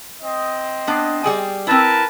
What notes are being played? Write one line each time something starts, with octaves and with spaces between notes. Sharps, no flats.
C4 D#5
B3 D4
G3 G#4 G5
C4 E4 A#4 B4 A5